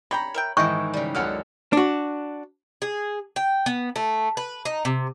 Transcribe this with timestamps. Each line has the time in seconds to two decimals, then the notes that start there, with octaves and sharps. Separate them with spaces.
0.11 D4 C#5 G5 A#5 B5
0.34 A#4 E5 G5
0.57 G#2 D#3 E3 E4 D#5 G5 C#6
0.93 C#3 G3
1.15 C#2 F#2 F#3 A4 F#5 F6
1.73 D4 F#4
2.82 G#4
3.36 G5
3.66 B3
3.96 A3
4.37 B4
4.65 D#4
4.85 C3